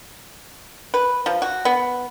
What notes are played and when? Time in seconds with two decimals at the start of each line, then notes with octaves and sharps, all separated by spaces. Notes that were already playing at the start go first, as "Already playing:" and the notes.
0.94 B4
1.26 F3
1.42 F#4
1.65 B3